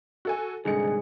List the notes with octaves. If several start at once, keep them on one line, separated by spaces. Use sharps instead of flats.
F#4 A4 G#5
C2 G#2 D3 D#4 G#4 C#7